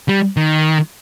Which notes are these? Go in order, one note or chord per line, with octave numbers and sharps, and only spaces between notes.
G3
D#3